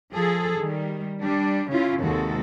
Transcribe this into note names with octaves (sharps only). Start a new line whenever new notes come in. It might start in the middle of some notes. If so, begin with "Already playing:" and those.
F3 G#4 A4
D#3 G3
G3 D4
C#3 C#4 E4 F4
D#2 C3 G#3 F#4 A4